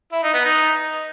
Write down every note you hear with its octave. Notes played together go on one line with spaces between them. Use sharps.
E4
D#4
B3
D#4